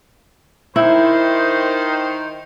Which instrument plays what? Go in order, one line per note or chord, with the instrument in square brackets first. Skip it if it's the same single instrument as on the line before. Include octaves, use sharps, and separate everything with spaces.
[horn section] D#3 C5 [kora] E4